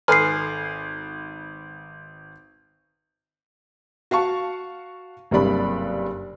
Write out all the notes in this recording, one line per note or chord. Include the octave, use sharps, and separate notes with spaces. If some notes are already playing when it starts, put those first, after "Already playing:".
G#1 A4 B4 G#5 C6 F6 C7
F#4 F5 A5 C#6
F#1 G2 C3 D5 B5